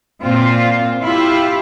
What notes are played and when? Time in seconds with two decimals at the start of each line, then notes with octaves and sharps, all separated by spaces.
0.23 A#2 C4 F4
1.03 E4 F4 G4